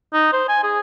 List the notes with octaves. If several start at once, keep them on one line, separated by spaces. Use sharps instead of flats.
D#4
C5
G#5
G#4